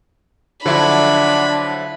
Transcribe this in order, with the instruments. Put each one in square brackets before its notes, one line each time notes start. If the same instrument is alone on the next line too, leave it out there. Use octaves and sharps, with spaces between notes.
[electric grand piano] D3 F3 [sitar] F#3 E4 F#4 [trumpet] D4 [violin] B5